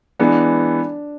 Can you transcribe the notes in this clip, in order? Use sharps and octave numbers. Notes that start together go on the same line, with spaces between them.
E3 G#3 B3 D4